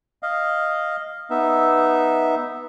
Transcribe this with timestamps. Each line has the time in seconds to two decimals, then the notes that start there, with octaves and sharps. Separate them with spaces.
0.23 D#5 F5
1.30 B3 D#4 E5